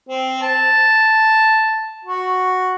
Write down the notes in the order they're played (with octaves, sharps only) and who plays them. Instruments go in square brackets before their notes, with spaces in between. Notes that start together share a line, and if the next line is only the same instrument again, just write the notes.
[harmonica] C4
A5
F#4